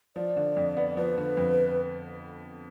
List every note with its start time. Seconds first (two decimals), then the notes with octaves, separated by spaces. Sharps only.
0.16 F3 D5
0.36 D3
0.57 F2
0.77 B3
0.97 F3 B4
1.18 D3
1.37 F2